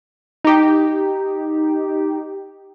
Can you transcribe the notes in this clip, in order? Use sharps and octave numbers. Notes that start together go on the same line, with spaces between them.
D#4 G4